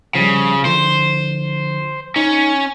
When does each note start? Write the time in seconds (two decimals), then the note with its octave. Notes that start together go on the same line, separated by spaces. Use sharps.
0.15 C#3 F3 G3
0.65 D3 F3 C5
2.16 C#4 D#4